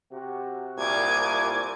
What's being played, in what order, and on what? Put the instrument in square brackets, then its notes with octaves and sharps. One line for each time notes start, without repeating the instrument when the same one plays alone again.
[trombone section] C3 F#4
[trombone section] C2 A#2 [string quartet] G#5 D6 G#6